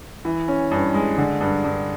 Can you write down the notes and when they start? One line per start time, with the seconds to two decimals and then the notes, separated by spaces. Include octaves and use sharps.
0.25 E3
0.48 C#4
0.71 G2
0.94 G#3
1.18 D3
1.41 G2
1.64 G2